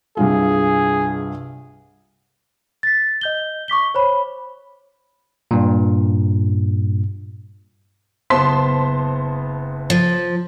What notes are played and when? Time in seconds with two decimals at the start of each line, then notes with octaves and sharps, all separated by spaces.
0.17 C2 G2 F4 G#4
2.83 A6 B6
3.21 D#5 G6 G7
3.68 C#6 D6 B6 G7
3.94 C5 C#5 B5
5.51 G2 A#2
8.30 F#1 B3 C5 A5 C6 B6
9.90 F3